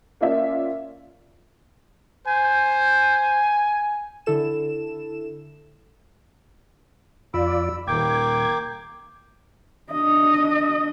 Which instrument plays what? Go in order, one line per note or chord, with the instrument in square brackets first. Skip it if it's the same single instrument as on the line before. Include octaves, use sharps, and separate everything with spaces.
[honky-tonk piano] A#3 C#4 F4 D5 E5
[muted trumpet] C5 [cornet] G#5
[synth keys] D3 E4 A4 E7
[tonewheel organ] F2 F4 D5 [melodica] B5 E6
[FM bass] D#1 [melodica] A#3 G5 D6 [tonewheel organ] G#6
[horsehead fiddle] D4 D#5